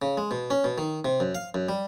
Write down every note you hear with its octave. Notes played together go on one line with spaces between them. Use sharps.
C#3
G#3
B2
C#4
B2
D#3
C3
F#2
F5
F#2
G3